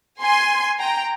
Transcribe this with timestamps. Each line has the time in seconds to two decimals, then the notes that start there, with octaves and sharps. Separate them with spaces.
0.20 G#5 C6
0.79 G5 A#5